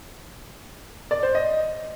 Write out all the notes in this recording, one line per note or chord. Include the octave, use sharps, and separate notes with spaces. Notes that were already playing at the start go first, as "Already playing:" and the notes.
D5
C5
D#5